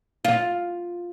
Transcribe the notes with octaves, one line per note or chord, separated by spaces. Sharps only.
F4